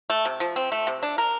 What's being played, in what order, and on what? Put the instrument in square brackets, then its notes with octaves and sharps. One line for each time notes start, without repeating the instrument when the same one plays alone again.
[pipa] A3
C3
F3
C4
A3
C3
D4
A#4